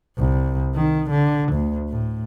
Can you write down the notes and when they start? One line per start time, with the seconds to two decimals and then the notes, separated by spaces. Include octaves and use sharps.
0.18 C2
0.75 D#3
1.10 D3
1.52 D2
1.89 A2